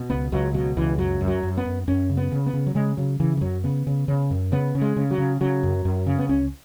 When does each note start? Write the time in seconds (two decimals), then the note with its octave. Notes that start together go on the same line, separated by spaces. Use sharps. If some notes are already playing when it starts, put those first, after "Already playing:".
Already playing: B2
0.10 C#2 B3
0.32 C#2 F#3
0.54 B2 F#3
0.77 C#2 E3
0.98 F#2 F#3
1.21 F#2
1.28 F#3
1.43 F#2
1.57 B3
1.65 F#2
1.87 F#2 C#4
2.10 C#3
2.17 B3
2.32 C#3
2.46 B3
2.53 C#3
2.67 F#3
2.75 C#3 G#3
2.97 C#3 F#3
3.20 C#3 E3
3.37 E3
3.41 F#2 F#3
3.64 C#3 B3
3.87 C#3
4.08 C#3
4.31 F#2
4.52 C#3 B3
4.75 C#3
4.81 G#3
4.97 C#3
5.11 F#3
5.18 C#3
5.41 C#3 F#3
5.63 F#2
5.85 F#2
6.06 C#3
6.19 B3
6.29 C#2 C#4